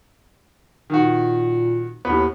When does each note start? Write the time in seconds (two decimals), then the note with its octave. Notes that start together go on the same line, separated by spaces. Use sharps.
0.90 A#2 D#3 F#4
2.05 D#2 A2 B3